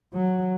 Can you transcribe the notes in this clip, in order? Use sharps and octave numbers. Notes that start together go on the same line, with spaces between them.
F#3